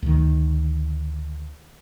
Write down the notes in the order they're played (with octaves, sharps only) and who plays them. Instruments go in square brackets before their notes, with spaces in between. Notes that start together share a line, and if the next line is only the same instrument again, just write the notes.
[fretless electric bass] D2 D#3